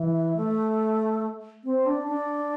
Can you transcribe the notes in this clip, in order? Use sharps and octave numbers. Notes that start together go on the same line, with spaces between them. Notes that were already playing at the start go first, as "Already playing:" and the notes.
Already playing: E3
A3
C4
D4
D4